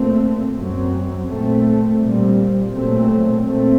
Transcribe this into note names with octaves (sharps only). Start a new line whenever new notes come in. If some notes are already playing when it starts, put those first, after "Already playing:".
Already playing: A#2 A3 C4
F#2 F#3 C4
A#2 A3 C4
A#2 G3 C4
A#2 F#3 A3 C4
A#2 A3 C4